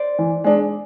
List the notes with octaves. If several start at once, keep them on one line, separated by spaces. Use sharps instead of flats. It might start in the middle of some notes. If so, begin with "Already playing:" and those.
Already playing: C5 D5
E3
G#3 D4